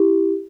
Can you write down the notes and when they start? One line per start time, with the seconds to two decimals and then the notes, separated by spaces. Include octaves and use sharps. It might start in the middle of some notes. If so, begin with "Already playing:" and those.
Already playing: E4 G4